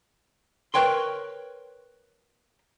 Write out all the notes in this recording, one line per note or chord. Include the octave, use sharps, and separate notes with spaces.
A#4 B4 C#5 G5 C6